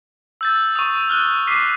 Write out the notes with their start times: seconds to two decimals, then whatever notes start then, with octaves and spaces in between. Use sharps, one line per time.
0.41 E6 G6 A6
0.76 C#6 D#6
1.09 F6 F#6 G7
1.47 D6 F6 B6 C7 D#7